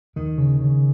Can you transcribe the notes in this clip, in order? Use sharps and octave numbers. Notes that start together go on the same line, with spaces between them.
D#2 D#3
C#3
C#3